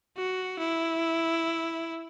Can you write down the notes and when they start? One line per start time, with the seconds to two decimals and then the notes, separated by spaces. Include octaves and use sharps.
0.17 F#4
0.59 E4